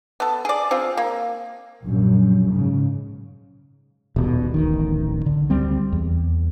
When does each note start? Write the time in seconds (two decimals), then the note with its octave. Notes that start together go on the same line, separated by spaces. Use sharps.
0.20 B3 A4
0.45 G#4 D5
0.71 C4 F4 G#4
0.97 A#3
1.84 A#1 F#2
2.51 G#2 C#3
4.16 D#1 B2
4.54 D1 A1 D#3
5.26 D3
5.50 D2 G3 C4
5.93 E2